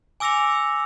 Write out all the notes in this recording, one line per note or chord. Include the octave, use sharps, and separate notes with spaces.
G#5 D6 E6 A#6 C#7 F7